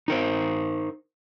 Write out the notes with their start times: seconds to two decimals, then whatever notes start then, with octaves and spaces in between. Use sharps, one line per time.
0.08 D#4 A#4 C5